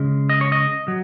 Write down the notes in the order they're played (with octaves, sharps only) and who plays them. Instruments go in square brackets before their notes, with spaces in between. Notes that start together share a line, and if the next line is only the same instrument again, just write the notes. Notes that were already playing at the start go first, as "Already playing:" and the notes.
Already playing: [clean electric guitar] C#3 G#3
D#5
C#5
D#5
F#3